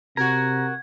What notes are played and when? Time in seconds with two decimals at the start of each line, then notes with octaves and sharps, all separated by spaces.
0.17 C3 F#4 A#4 A#5 G#6